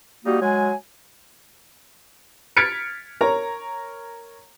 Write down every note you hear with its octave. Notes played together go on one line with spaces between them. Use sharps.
G3 A#3 D#4 F#4
F#3 G#3 G#5
F6 G#6 A6 B6 C#7 D7
A#4 C#5 A#5